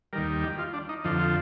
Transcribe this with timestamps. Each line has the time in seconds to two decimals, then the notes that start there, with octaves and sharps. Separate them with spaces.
0.13 D#2 D#3 G3 A#4
0.43 G4
0.58 F4
0.74 D4
0.89 D#4
1.04 F2 D3 F3 D#4
1.19 F4